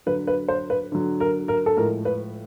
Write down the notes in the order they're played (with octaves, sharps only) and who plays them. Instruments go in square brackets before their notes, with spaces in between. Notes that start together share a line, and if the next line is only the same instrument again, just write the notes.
[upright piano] D3 F#3 B4
B4
C5
B4
D3 F#3
A#4
A#4
A4
A2 F3 G#3 A#4
B4